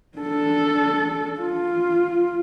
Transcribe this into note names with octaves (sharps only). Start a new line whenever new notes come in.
D4 A4
F4